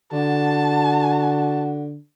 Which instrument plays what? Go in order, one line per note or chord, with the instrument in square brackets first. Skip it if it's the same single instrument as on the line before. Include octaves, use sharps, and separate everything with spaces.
[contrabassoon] D3 [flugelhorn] F#4 [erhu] A5